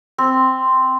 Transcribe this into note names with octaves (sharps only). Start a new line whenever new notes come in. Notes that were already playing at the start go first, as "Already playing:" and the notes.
C4